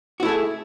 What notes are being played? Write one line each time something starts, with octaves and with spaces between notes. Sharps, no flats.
A3 E4 F#4 G#4